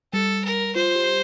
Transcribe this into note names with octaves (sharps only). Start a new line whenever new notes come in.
G3 A4
A#4
F4 C5
G4